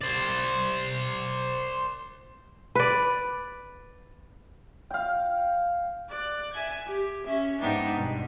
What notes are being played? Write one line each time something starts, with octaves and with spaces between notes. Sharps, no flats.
C5 D5
B4 D5
F5 G5
D5 F#6
E5 G#5 G#6
G4
C#4 E5
G#2 G#3 B3 D4 D#4 G4
G2 B2